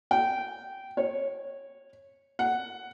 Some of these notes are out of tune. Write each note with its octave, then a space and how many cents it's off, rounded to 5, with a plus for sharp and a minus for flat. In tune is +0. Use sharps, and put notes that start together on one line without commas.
G5 -20
C#5 -15
F#5 +5